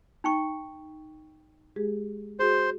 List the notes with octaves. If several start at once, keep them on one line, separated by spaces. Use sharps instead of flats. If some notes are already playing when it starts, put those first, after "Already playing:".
D#4 G5 C#6
G#3 G4 G#4
F#4 G#4 C5